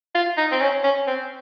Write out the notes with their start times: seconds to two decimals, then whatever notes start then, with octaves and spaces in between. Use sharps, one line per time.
0.15 F4
0.38 D#4
0.52 C4
0.61 C#4
0.84 C#4
1.08 C4